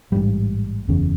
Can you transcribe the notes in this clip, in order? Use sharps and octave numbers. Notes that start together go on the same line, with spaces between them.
A1 G#2 G3
F#1 E2 C#3